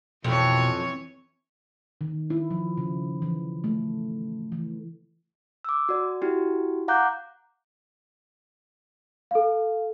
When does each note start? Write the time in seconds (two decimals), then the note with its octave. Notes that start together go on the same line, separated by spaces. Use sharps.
0.24 F2 B2 E3 C#5
2.01 D#3
2.30 E4
2.51 F3
2.78 C#3
3.22 E3
3.64 A3
4.52 E3
5.65 D6 E6
5.89 F#4 D5
6.22 E4 F#4 G4
6.88 F5 F#5 A#5 D6 F#6 G6
9.31 A4 F5